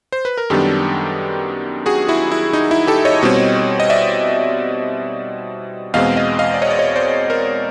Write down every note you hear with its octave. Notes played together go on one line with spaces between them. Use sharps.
C5
B4
A#4
F#2 D#3 G3 B3 D4 G4 A4
F#4 G#4
E4 F#4
E4
D#4
E4
G4 A4
C#5 D#5
B2 G3 C4
D#5
D5 E5
E2 B2 G#3 C4 D#5 F5
D#5 F5
D#5 F5
D5
C#5 D#5
D5
C#5 D#5
C5 D5
A#4 C5